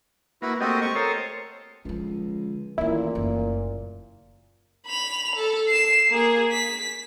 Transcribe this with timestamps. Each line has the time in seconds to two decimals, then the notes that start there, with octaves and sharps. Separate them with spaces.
0.42 A#3 E4 F#4 B4
0.61 A3 A#3 C4 F#4 G4 D#5
0.81 C#6
0.96 A4 A#4 C5 C#5 D#6
1.85 C#2 D3 F3
2.78 A1 A#2 D#3 A3 E4
3.15 F#1
4.87 B5 F7
5.36 A4
5.68 C7 E7
6.09 A#3 G#4
6.52 B6